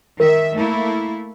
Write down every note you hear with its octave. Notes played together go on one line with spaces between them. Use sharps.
D#3 A#4 E5
A3 A#3 E4